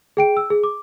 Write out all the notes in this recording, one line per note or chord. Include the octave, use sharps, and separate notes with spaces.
G#4 G5 D7
E6
G#4
D6